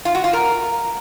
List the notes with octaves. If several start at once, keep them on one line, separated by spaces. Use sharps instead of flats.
F4
F#4
F4
A#4